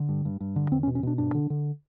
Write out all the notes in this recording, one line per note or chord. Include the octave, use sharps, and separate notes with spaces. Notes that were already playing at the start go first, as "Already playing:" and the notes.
Already playing: D3
G2
G2
G2
D3
E2 C4
C#4
B2
C#4
B2 D4
G2 D4
D3
D3